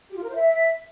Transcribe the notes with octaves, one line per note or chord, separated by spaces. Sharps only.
G4
F4
A#4
C5
E5